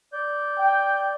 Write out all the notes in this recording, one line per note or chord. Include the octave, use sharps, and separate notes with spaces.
D5 G6
G5